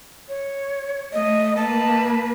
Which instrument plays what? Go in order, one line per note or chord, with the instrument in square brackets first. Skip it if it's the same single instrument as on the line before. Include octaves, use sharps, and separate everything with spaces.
[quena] C#5
[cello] A3 [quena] D#5
[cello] A#3 B4 [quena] A5